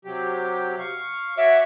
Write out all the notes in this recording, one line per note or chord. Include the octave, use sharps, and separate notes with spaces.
C3 F#3 G4
F5 C#6
F#4 C#5 E5 D6